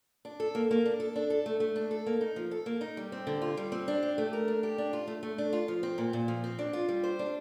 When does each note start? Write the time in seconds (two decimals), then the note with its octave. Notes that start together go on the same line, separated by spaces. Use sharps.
0.25 D4
0.40 A4
0.55 A#3
0.71 A#3
0.86 D4
1.00 A4
1.16 D4
1.30 A4
1.46 A3
1.60 A3
1.76 D4
1.91 A4
2.06 A#3
2.21 D#4
2.36 F3
2.51 A4
2.66 A#3
2.81 D#4
2.97 G3
3.12 C4
3.27 D3
3.41 F4
3.57 G3
3.72 C4
3.88 D4
4.03 G4
4.18 A3
4.33 A#4
4.48 D4
4.63 G4
4.78 D4
4.93 F4
5.07 A3
5.23 A3
5.38 D4
5.53 F4
5.68 F3
5.83 C4
5.98 A#2
6.13 A#2
6.28 F3
6.44 C4
6.59 D4
6.73 F4
6.89 G3
7.03 C5
7.19 D4